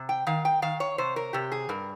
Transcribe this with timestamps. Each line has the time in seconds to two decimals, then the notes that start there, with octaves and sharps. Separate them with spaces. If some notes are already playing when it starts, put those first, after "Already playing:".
Already playing: C3
0.09 G5
0.27 D#3 F5
0.45 G5
0.62 D#3 F5
0.80 C#5
0.98 C3 C5
1.16 A#4
1.33 C3 G4
1.52 G#4
1.69 G2 A#4